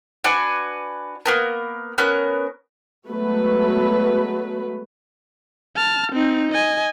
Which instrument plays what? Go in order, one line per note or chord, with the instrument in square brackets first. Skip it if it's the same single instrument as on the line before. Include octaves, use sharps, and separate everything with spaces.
[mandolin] D4 F#4 B4 G#5
A#3 B3 A#4
B3 C#4 A#4 F#6
[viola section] F#3 G#3 A3 B3 F#4 B4
[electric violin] A5 F6
C4 D#4
D#5 G#5